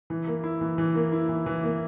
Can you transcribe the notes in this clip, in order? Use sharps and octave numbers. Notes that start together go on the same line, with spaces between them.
E3
A#3
E4
E3
E3
A#3
E4
E3
E3
A#3